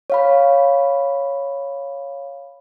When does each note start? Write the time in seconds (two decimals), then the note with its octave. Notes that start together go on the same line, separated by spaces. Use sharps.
0.10 C#5 F5 B5